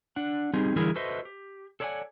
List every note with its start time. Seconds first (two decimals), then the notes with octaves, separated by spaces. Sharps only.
0.16 D4 F#5
0.53 G3 C4 D#4 G4 G#4
0.76 D3 E3 G3 E4 G#4 A#4
0.95 F#4 A4 B4 C5 D#5 E5
1.25 G4
1.80 A4 C#5 D5 F5 F#5 G#5